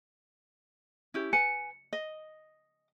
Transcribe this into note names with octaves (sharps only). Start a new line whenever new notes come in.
C#4 E4 G4
B4 G#5 C#7
D#5